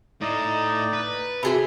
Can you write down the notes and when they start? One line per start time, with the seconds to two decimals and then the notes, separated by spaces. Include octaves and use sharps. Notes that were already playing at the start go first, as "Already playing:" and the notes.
0.21 A2 D#4 E4 D5 D#5
0.93 B4
1.43 C3 F#4 G#4 A4 E5 B5